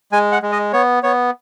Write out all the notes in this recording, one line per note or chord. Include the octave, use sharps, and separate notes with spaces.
G#3 G#5
F#5
G#3
D#5
B3 C#5
B3 C#5